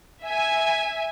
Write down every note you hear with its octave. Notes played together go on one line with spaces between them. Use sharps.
E5 G#5